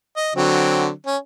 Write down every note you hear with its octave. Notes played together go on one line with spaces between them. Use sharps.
D#5
D3 F#3 C4
C#4